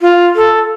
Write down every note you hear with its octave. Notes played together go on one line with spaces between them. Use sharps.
F4
A4